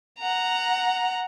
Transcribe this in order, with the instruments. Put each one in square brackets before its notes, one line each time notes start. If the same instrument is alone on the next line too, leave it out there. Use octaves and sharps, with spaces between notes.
[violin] F#5 A#5